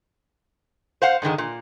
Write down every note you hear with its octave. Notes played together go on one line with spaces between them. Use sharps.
C5 F5 F#5
G#2 D3 D#3 G#3
A#2